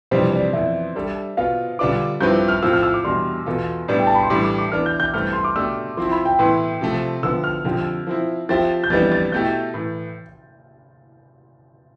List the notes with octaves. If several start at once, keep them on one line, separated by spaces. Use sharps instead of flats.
F2 C3 E3 G3 D4 C5
D5
F2 E3 B3 E5
G3 D4 A4
B2 B3 F4 F5
D3 G3 D4 F4 B4 D6
G2 F3 C4 E4 B4 G6
E6
F6
A2 F3 C4 F4 E6
F6
E6
D6
E2 B2 G3 D4 C6
E2 B2 B3 F4 A4
A2 G3 B3 D4
G5
A5
B5
C6
A2 E3 G3 D4 D6
D6
D6
E3 B3 D4 F6
G6
G6
G2 E3 A3 C4 F6
C6
D6
B2 A3 D4 G4 E6
F3 C4 E4 C6
B5
G5
A2 E3 B3 E4 B4 C6
C3 F3 A3
D3 F3 B3 E6
F6
F2 D3 F3 C4 G4
F3 C4 E4
F3 C4 G4 C5 E5 A6
G6
F2 E3 G3 B3 D4 A6
A6
B2 A3 E4 G4 G6
A2 E3